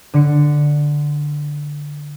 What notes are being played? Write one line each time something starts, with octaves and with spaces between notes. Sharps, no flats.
D3 C#7